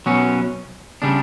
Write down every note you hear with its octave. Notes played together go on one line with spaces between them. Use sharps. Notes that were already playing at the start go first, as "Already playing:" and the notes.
B2 F#3 C#4
C#3 G3 D4